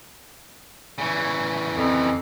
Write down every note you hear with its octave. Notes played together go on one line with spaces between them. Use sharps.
C#3 E3
F2